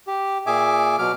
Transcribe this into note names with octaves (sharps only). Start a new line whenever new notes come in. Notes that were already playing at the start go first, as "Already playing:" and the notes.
G4
A#2 G#4 E5 G#5 D6
B2 F#3 D6 F6